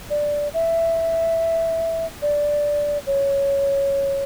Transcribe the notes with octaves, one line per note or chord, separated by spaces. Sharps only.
D5
E5
D5
C#5